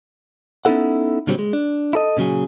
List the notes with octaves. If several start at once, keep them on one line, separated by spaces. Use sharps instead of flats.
B3 C#4 D#4 E4 A4 F#5
A#2 D3 F#3 G3 C4
G#3
D4
E4 A4 D#5
A#2 C#3 E3 F#3 G#4